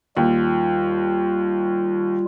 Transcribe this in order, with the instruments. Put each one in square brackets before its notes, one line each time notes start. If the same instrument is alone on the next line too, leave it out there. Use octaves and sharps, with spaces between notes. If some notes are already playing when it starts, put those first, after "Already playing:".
[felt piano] D#2 [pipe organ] G3 F4